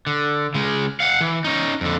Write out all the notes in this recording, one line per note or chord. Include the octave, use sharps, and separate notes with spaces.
D3
C#3 G#3
F5 F#5
E3
C#4 D#4
F2 D3